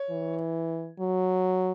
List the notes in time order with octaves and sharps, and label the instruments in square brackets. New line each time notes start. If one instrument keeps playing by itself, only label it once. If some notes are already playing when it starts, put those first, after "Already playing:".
Already playing: [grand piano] C#5
[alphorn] E3
F#3